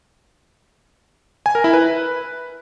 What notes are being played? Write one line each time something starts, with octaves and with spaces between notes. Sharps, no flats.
G#5
A#4
E4
B4